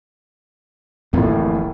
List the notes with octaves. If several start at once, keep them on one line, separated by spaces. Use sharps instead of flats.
D1 A1 F2 A2 A#3